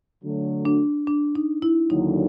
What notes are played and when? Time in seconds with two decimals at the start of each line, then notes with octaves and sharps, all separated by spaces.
0.24 D3 F#3 A3
0.65 D4
1.07 D4
1.35 D#4
1.62 E4
1.90 D#2 D3 F#3 D#4